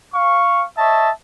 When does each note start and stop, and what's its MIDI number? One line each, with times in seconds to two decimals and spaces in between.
0.13 0.63 77
0.13 0.63 85
0.77 1.09 73
0.77 1.09 75
0.77 1.09 76
0.77 1.09 81